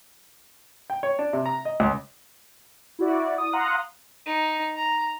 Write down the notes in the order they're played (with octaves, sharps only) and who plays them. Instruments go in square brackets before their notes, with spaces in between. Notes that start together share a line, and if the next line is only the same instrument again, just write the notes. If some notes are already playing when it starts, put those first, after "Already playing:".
[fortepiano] G5
C#5
D4
C3
A#5
D#5
C#2
[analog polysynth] E4 F#4 D5
D#6
F5 F#5 A#5 C6 D#6 F#6
[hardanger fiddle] D#4
A#5